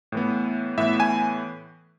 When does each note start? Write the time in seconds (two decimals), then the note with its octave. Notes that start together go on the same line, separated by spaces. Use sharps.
0.12 A2 E3 B3
0.78 A2 E3 B3 E5
1.00 G#5